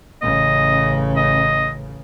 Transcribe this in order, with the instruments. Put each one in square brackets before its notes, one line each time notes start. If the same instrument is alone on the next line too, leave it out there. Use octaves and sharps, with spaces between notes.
[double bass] A1 C#3 [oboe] D#5
[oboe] D#5